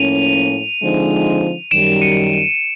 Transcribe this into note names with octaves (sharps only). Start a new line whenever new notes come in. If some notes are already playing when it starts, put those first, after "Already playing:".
Already playing: A2 F3 A#3 C#4 D#7 F7
D3 F3 G#3 C4 D#4
F#2 D#3 G3 D7 E7
C#7 D#7